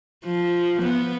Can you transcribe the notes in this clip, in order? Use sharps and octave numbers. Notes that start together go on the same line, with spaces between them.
F3
B3